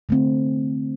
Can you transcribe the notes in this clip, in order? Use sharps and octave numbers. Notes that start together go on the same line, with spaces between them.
D3 A3 C4